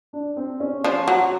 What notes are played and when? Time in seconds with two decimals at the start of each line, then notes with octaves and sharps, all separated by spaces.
0.13 D4
0.36 C4
0.60 C#4
0.84 F3 C#4
1.08 F#3
1.19 F#4